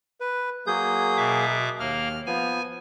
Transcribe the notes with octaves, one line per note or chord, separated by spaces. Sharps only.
B4
F#3 A#3 G#4 D#6 G6
B2 E5 D6
D#2 A#3 F6
F3 B3 G#5